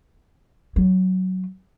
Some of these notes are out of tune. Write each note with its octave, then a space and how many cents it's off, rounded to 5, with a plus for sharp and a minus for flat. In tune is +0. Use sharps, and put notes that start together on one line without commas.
F#3 +10